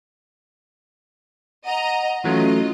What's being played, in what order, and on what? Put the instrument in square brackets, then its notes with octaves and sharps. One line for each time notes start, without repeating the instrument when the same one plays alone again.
[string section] D#5 A#5 [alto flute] F#5
[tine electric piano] E3 F#3 A3 [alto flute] C#4 [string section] F4 D#5